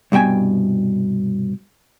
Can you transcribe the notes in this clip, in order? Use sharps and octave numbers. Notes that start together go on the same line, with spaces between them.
C2 G2 B2 G5 G#5